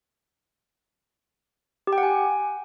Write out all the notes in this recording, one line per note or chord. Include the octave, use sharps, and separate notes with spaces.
G4
G5
F#5
G#5